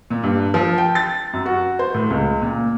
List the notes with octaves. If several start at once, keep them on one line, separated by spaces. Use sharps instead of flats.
A#2
G2
F3
G5
A6
F#2
F#4
C5
A2
C#2
A#2